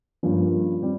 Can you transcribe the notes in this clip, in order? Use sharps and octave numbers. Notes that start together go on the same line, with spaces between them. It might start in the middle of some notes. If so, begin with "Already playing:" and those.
G2 F3 A#3 C#4
G3 C4 G4